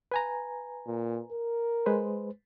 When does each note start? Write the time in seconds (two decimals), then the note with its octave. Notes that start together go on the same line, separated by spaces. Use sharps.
0.12 B4 G#5 A#5
0.87 A#2
1.32 A#4
1.86 G#3 B4 C5